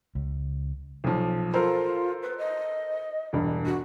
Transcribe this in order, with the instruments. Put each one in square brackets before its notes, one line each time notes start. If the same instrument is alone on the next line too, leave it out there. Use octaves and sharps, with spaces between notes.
[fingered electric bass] C#2
[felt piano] B1 F3
[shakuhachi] F4 [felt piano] A4 A#4 C5
[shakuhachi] B4
D#5
[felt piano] E1 G2
[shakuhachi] F#4